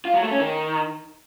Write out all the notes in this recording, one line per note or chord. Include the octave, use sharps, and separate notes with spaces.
F4
F#3
A3
C#4
D#3